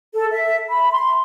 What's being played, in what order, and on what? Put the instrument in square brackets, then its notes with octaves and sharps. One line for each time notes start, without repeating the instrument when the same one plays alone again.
[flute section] A4
E5
B5
C6